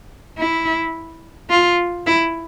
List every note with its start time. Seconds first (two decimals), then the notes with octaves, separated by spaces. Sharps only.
0.38 E4
1.50 F4
2.07 E4